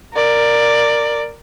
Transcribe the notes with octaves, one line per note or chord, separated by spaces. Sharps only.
A#4 D5